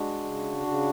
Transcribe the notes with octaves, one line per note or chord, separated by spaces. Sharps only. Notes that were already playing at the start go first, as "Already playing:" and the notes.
Already playing: G#3 D4 F#4
C#3
C#3